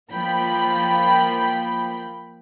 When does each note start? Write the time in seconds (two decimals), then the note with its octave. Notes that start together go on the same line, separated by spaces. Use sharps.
0.12 F3 A#3 G5 B5